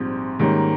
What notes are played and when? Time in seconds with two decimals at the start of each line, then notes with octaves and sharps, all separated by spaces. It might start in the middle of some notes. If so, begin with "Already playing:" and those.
Already playing: A#1 G#2 G3 C4
0.39 G#2 D#3 G3 A#3 C#4